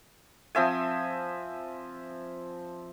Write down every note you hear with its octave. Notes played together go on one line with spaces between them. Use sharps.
F3 C4 E5 G#5